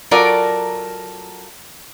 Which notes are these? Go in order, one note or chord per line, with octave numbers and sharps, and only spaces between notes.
F#3 F4 A4 A#4 D5